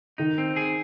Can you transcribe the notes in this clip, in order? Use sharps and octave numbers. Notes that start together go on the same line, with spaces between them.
D#3 D#4
C4
G#4